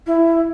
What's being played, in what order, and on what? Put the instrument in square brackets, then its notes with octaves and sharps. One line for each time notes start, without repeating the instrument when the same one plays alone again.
[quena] E4